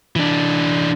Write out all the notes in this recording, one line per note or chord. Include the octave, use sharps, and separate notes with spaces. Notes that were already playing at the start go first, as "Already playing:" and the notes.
E3 D4